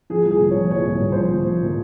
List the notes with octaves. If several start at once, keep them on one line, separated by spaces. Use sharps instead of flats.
F3 G#4
C2
G#4
A#2
C#5
F3
C2 C#5
A#2
A#2
F3 C5
A#2
F3
A#2